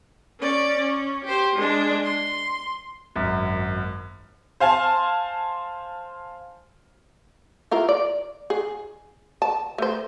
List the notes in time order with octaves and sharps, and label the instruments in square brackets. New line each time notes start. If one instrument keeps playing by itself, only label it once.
[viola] C#4 D5
C#4
G4 C5
G#3 D4
C6
[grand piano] G#1 F#2
[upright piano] C5 F5 G#5 A5 C6
[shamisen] E4 F4 A#4
D5
G#4
A5
A3 C5